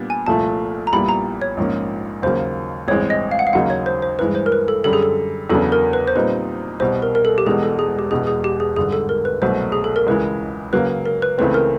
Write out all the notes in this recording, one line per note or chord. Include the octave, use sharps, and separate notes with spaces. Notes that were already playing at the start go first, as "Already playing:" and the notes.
Already playing: A#2 G3 B3 D4
G#5
C2 A#2 F3 A3 A5
A#5
A#1 A#2 G3 B3 E4 B5
A#5
C#5
A#1 G#2 F3 A#3 C#4
D#2 C#3 F#3 A#3 C5
A1 G2 E3 G#3 C4 C#5
D#5
F5
F#5
F5
D#2 C#3 F#3 A#3 D#4 F#5
C#5
C5
C5
G2 E3 G#3 B4
C5
A#4
B4
A4
F#2 D3 G3 A4
G#4
A4
E2 C#3 F#3 B3 D4 A4
A#4
B4
C5
A#2 G3 C4 D#4 B4
C2 B2 G3 C5
A#4
A#4
A4
G4
E1 E2 B2 G#3 G#4
A4
G#4
G4
E1 E2 B2 G#4
G#4
G4
G#4
G#1 G2 D3 G#4
A4
A#4
B4
C2 B2 F#3 A3 C5
G#4
A4
A#4
C#2 C#3 E3 G#3 B4
C#3 F#3 A#3 B4
A#4
B4
C#2 C#3 E3 A3 C4 B4
A#4